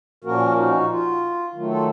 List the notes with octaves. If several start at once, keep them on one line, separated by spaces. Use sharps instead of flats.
A#2 F3 A#3 C#4 F#4 A#4
D#4 F#4
F4
D#3 F#3 A3 F4
F4 A4